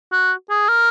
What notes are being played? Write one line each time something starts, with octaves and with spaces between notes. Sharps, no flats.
F#4
G#4
A#4